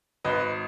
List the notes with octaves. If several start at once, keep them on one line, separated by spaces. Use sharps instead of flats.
G#1 B4 D#5